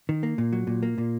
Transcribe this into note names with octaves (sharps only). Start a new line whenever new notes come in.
D#3
A#3
A#2
F#3
A#2
A#3
A#2